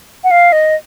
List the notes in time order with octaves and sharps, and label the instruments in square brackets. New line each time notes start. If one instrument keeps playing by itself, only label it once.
[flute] F#5
F5
D#5